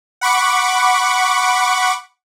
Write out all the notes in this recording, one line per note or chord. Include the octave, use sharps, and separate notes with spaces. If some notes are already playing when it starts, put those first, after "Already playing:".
F#5 B5 C#6 D6